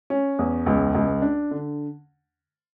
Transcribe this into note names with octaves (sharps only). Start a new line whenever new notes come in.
C#4
E2
C#2
C#2
D4
D3